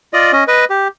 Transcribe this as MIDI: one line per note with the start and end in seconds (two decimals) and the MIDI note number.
0.13 0.32 65
0.13 0.32 74
0.13 0.32 75
0.32 0.44 61
0.32 0.44 75
0.48 0.65 71
0.48 0.65 75
0.70 0.88 67